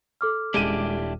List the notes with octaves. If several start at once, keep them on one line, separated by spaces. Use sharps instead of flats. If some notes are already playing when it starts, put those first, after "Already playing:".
A4 D6 F6
D#1 G#3 D4 E4 G4 D#7